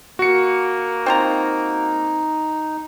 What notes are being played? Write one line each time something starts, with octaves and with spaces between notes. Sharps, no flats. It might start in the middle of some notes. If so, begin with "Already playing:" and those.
A#3 F#4 C#7
C4 D#4 F4 A#5